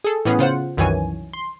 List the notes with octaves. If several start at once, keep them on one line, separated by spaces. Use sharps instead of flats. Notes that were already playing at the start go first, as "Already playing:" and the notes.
G#4 A4
A2 E3 B3 C#4 G#4
C#3 F4 C5 F#5
C2 F#2 D#3 E3 C#5 G#5
C6